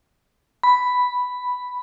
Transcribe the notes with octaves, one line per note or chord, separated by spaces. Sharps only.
B5